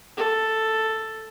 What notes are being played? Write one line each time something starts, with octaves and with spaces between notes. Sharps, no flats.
A4